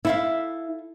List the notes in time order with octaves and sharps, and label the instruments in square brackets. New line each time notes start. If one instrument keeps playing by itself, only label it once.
[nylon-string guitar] E4 [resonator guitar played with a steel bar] A4 E5 F5